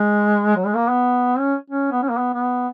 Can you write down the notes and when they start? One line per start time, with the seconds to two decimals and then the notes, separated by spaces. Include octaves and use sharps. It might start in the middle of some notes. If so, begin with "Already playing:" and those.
Already playing: G#3
0.56 F#3
0.66 G#3
0.74 A#3
0.90 B3
1.38 C#4
1.70 C#4
1.92 B3
2.02 C#4
2.10 A#3
2.18 B3
2.34 B3